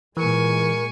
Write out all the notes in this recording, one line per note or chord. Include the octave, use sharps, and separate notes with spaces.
A#2 E3 G#3 A#4 G#5 C#6